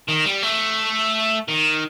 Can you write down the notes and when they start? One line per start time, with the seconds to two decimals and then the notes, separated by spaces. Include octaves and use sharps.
0.08 D#3
0.25 G3
0.43 A3
1.48 D#3